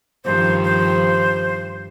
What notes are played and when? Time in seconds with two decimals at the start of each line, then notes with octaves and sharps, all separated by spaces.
0.25 G2 D#3 F3 C5
0.64 C5